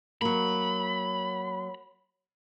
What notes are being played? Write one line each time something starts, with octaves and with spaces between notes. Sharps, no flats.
F#3 A#3 B5